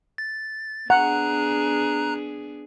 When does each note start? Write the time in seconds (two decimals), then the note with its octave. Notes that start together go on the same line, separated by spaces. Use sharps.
0.18 A6
0.90 B3 D4 G#4 F#5 A#5 F#6